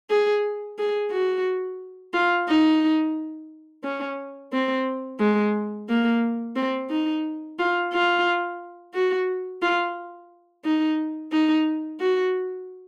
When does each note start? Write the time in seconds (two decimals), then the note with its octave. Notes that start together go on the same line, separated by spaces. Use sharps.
0.10 G#4
0.78 G#4
1.12 F#4
2.14 F4
2.49 D#4
3.84 C#4
4.53 C4
5.20 G#3
5.89 A#3
6.56 C4
6.90 D#4
7.59 F4
7.93 F4
8.94 F#4
9.62 F4
10.65 D#4
11.32 D#4
12.00 F#4